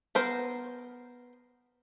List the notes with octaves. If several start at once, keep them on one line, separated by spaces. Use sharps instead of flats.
B3 A#4 C5